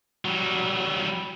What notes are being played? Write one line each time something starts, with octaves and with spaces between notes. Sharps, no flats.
F#3 G3